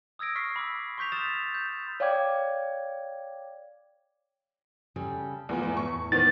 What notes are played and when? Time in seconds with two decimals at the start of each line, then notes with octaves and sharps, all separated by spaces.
0.19 D#6 E6 G#6 A#6 D7
0.35 C#6 F6 B6 C7
0.56 B5 D6 E6
0.98 C6 C#6 G6 B6 F7
1.12 D#6 F6 G6 A6 E7 F7
1.55 G6
2.00 C#5 D5 F5 G5 D6 G#6
4.96 C#3 G3 A4
5.49 E2 A#3 B3 F4
5.61 A3 B3 E4
5.77 E2 A2 C#6
6.12 D#3 B3 C5 D5 A6